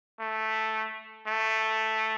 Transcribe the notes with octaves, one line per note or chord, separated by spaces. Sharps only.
A3
A3